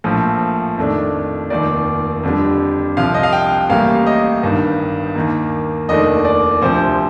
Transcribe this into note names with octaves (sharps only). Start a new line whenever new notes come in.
A#1 A2 F3
F2 D#3 A3 D4
F1 D#2 D#3 D5
F2 D3 G3
C2 C3 F3 F5
D#5
F5
G5
A1 A2 G3 A#3 F5
D#5
G1 G2 D#3
D#2 D#3 A#3
F1 D#2 D#3 A3 D4 D#5
D5
D2 C3 F3 C5